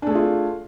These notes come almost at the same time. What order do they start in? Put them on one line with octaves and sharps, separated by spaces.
D4 A3 G#4 F4